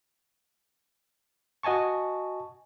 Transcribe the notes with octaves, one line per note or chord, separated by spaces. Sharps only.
F#4 D#5 G#5 A5 C#6